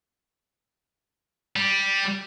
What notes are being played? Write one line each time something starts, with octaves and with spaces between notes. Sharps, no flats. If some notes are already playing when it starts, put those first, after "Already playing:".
G3